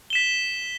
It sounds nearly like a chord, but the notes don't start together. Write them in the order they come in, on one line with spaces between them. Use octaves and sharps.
G7 E7 B6